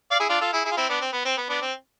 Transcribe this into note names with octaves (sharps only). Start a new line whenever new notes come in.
D5 F5
E4 G#4
D4 F4
F4 A4
E4 G#4
E4 G#4
F4
C4 E4
B3 D4
C4
B3
C4
B3
B3 D4
C4